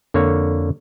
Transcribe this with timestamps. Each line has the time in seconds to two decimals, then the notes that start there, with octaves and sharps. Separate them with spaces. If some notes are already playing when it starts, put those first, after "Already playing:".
0.14 F2 D3 A#3 C#5